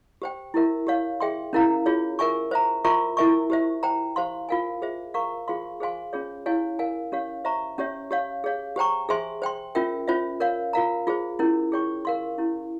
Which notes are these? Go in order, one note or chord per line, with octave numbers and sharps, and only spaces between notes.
G4 C5 G5
E4 G4 A#4 E5
G4 C#5 F5
G#4 E5 G5 C6
C#4 E4 A#4 F5 A#5
F4 G#4 C#5
A#4 E5 G#5 C#6
C5 E5 A#5
F4 A#4 E5 A#5 C#6
E4 A#4 E5 G#5 C#6
G4 C5 E5
C5 G5 A#5
G4 C5 F5 C6
F4 A#4 F5 G#5
G#4 C5 E5
A#4 F5 A#5 C#6
F4 G#4 C5 F5 C6
G#4 C5 F5 G#5 C6
C#4 F4 G#4 C#5
E4 G4 C#5 F5 G#5
A#4 F5 G#5
C#4 G4 C#5 F5
C5 E5 A#5 C#6
C#4 G4 C#5 E5
G4 C#5 F5
G#4 C#5 F5
G4 C5 G5 A#5 C#6
G#4 C5 E5 G#5 C6
C5 G5 C6
C#4 F4 A#4 E5 G5
C#4 F4 C5 E5
A#4 C#5 F5
F4 A#4 F5 A#5
F4 G#4 C5
C#4 E4 A#4
G#4 C#5 G5 C#6
A#4 F5 C6
C#4 E4 G4